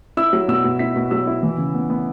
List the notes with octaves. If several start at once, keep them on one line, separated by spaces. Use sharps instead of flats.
E4 E6
F#3
B2 E6
B2
E4 B6
B2
F#3 E6
E4
E3
C#3
B3
B3